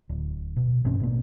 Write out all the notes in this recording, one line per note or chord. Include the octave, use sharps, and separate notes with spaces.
D1
B2
A1 G2 C4 C#4
A1 B2 A#3